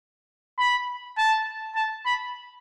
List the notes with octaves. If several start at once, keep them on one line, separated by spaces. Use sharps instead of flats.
B5
A5
A5
B5